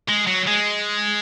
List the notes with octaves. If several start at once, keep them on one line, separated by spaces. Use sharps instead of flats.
G#3
F#3
G#3